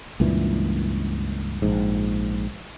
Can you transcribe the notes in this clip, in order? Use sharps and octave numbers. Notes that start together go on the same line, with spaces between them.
C#2 G2 A#2 E3
A#1 G#2